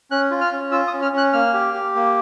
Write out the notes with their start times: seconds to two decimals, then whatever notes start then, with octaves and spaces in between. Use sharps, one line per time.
0.11 C#4 F#6
0.31 F4
0.41 F6
0.52 C#4
0.71 F4 E6
0.87 D#6
0.93 C#4
1.02 F6
1.12 C#4
1.17 F#6
1.33 A#3 F6
1.53 G4
1.74 G4
1.95 A#3